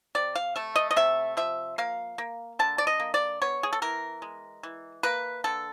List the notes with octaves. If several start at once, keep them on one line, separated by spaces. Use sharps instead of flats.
C3 D5
F5
A3 E5
D#5
D#5
C3 E5
F3 E5
A#3 F5
A#3
D3 A5
D5
D#5
A#3
D5
B3 C#5
G#4
A4
E3 A#4
G#3
E3
A#3 B4
D3 A4